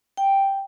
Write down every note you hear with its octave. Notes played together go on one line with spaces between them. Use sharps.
G5